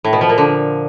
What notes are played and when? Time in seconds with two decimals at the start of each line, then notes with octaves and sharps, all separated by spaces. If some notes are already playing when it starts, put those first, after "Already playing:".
0.04 A2
0.13 B2
0.21 F3
0.29 A#2
0.38 D3